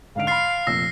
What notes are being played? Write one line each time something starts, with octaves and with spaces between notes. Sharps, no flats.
G#2 D3 F5 D7
B5 C6 F6 A6 C7
F1 A#2 E6 A#6